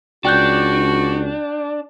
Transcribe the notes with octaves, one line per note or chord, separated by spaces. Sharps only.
C#2 D4 F#4 G5 F#6 G6